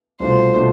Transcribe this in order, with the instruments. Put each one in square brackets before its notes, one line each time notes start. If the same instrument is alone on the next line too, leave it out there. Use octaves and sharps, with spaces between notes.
[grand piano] C2 B2 A3 D4 F4 [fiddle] C5
[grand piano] B2 A3 D4 F4